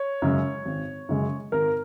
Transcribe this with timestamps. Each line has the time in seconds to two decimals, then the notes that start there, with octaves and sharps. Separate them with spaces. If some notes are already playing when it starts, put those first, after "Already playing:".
Already playing: C#5
0.22 F#2 C#3 G#3
0.65 G#1
1.09 F#2 C#3 G#3
1.52 G#1 A#4